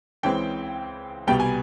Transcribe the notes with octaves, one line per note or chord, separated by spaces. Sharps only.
C#2 C#3 E3 G#3 C4 G5
C2 B2 G3 B3 G5
G#5